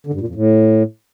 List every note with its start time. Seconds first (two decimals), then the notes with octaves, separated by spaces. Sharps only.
0.07 D3
0.14 G2
0.21 A#2
0.28 F2
0.35 A2